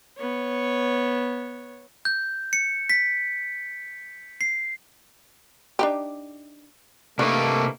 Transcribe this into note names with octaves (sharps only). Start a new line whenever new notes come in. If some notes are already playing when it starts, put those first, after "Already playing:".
B3 C#5
G6
C#7
B6
C7
D4 D#4 G4
C3 A3 A#3 D4 B4